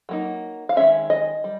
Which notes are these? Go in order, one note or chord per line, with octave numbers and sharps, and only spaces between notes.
F#3 A#3 D#4
F5
D#3 G#3 C#4 E5
D#5
G3